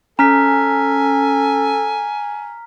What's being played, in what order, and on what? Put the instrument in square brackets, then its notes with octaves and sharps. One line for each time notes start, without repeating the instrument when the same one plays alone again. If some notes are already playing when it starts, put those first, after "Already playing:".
[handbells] C#4 [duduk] A4 [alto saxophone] G#5 [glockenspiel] A#5 F6 B6